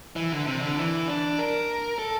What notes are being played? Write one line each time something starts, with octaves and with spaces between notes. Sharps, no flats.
E3
D3
C3
D3
E3
D4
A#4
A4